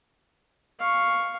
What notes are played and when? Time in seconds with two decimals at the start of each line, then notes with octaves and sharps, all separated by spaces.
0.80 F5 C#6